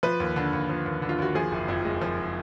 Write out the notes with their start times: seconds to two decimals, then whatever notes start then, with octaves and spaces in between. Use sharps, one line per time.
0.03 F3 B4
0.20 D#2
0.36 D3
0.53 D#2
0.69 F3
0.86 D#2
1.02 D3
1.09 F4
1.18 D#2 F#4
1.35 F3 G#4
1.52 F#1
1.68 F2
1.85 G#3
2.02 F3